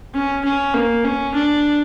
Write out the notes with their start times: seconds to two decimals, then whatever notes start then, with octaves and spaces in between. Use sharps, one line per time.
0.14 C#4
0.45 C#4
0.74 A#3
1.04 C#4
1.35 D4